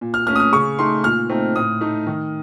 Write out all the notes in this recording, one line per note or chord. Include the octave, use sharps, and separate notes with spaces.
A#2
F6
A3 C#4 F6
D#6
F6
C#3 C#6
A3 D#4 C6
A#2 F6
A3 C4 D#4
A2 D#6
A3 D#4
D#3